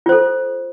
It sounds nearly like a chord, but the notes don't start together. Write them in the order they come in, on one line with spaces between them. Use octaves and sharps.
F4 C5 A4